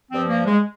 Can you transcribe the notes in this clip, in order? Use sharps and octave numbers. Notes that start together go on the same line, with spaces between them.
G2 F3 C4
A#3
G#3